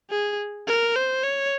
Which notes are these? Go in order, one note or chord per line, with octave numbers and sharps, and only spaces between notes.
G#4
A#4
C5
C#5